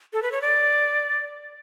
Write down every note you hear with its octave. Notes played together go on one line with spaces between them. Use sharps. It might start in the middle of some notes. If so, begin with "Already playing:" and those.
A4
B4
C#5
D5